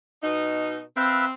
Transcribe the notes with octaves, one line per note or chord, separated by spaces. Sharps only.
B2 D#4
C4 B4 E5 F5